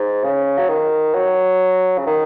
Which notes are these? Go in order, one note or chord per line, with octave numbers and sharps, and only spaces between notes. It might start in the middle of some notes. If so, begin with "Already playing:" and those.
Already playing: G#2
C#3
F#3
D#3
F#3
C#3
D#3